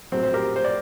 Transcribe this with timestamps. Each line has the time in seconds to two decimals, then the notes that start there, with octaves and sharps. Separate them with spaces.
0.12 A#1 A2 F#3 C4
0.23 C5
0.34 G4 A#4
0.56 C5
0.64 D5